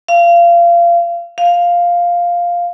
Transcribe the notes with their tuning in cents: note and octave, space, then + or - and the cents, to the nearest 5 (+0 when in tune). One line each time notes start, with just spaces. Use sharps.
F5 -25
F5 +0